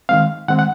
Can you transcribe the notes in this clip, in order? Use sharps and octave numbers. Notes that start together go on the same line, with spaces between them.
D#3 G#3 C4 F5
D#3 G#3 C4 F#5
F#5